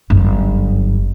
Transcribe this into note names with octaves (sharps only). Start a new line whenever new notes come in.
G1 F#2